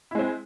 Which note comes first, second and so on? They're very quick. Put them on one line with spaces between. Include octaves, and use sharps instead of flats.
E4 G#3 C4